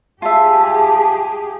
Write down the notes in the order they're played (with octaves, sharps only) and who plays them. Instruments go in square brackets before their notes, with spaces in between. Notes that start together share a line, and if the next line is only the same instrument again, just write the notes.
[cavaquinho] F4 E5 [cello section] G4 G#4 [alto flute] A5